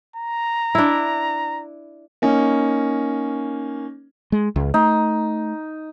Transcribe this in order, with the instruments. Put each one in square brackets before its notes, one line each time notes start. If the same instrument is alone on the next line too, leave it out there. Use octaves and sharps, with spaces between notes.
[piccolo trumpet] A#5
[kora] D4 E4
[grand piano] A#3 C#4 D#4
[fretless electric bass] G#3
C#2
[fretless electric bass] A3 [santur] D#4